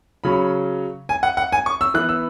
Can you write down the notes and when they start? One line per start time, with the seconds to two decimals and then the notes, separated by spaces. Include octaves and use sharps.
0.24 C#3 F#3 C#4 B5
1.09 G#5
1.23 F#5
1.37 F#5
1.52 G#5
1.66 C#6
1.81 E6
1.94 E3 B3 F#6
2.09 E6